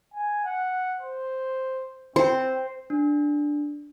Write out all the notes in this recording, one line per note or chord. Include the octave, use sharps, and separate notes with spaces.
G#5
F#5
C5
C4 C5
D4